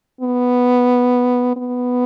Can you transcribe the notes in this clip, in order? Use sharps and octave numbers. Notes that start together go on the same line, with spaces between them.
B3
B3